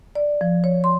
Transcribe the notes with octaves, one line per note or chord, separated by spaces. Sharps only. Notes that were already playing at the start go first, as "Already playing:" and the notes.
D5
F3
C#5
C6